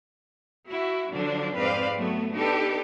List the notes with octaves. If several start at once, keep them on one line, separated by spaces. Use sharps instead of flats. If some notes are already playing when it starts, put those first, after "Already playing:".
E4 F#4
D3 F3 F#3 D4
F2 G#2 C4 B4 D5 F5
F#3 A3 B3
B3 D4 D#4 G4 A4 B4